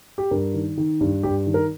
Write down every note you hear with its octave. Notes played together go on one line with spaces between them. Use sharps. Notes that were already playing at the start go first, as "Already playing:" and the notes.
G4
G2 A#4
D#3
D#3
G2
G2 G4
D#3
A#4